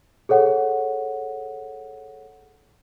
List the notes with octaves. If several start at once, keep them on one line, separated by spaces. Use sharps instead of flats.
G#4 A4 C#5 F#5